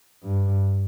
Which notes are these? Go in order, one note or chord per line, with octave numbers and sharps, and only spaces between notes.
G2